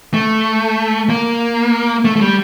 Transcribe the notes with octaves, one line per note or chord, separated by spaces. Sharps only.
A3
A#3
A3
A3
G3